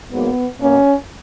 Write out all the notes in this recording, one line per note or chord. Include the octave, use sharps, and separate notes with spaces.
G#2 F#3 A#3 B3
B2 A#3 C#4